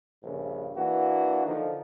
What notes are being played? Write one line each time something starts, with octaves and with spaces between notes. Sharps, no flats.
A#1 G2 C#3
E3 A#3 D4 F#4
D3 D#3 F3 D#4